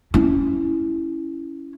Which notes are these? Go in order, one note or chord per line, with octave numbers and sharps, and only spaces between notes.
C#4 E4